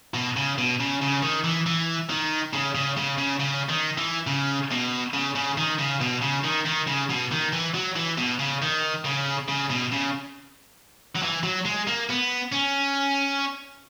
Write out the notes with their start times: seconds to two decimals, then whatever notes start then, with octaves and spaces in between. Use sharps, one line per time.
0.14 B2
0.37 C#3
0.58 B2
0.80 C#3
1.02 C#3
1.23 D#3
1.44 E3
1.66 E3
2.10 D#3
2.53 C#3
2.75 C#3
2.97 C#3
3.18 C#3
3.40 C#3
3.69 D#3
3.98 E3
4.27 C#3
4.71 B2
5.13 C#3
5.35 C#3
5.58 D#3
5.79 C#3
6.01 B2
6.22 C#3
6.44 D#3
6.66 D#3
6.87 C#3
7.10 B2
7.32 D#3
7.53 E3
7.75 F#3
7.96 E3
8.18 B2
8.39 C#3
8.62 D#3
9.05 C#3
9.49 C#3
9.70 B2
9.92 C#3
11.16 F#3
11.23 E3
11.43 F#3
11.65 G#3
11.87 A#3
12.09 B3
12.52 C#4